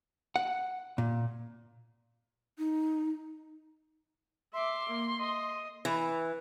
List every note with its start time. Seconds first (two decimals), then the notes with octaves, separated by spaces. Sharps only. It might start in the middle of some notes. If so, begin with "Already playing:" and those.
0.36 F#5
0.98 A#2
2.59 D#4
4.53 E5 C6 D6
4.88 A#3
5.20 D#5
5.85 E3